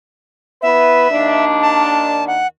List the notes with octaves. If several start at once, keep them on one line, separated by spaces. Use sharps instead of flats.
B3 E4 B4 E5
D#2 D#3 D4
A5
F#5